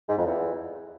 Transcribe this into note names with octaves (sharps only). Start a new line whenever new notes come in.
G#2
F2
E2